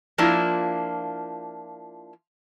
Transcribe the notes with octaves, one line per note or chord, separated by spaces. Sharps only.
F3 A#3 D4 E4 F4